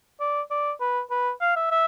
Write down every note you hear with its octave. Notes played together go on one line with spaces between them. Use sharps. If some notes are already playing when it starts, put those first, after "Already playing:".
D5
D5
B4
B4
F5
E5
E5